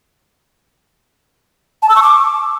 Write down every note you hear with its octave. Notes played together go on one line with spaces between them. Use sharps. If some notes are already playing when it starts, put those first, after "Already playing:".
A5
E6
C#6
D6